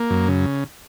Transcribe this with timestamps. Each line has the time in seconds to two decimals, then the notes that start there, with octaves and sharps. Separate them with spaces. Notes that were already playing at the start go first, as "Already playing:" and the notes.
Already playing: A#3
0.10 F#2
0.28 C#3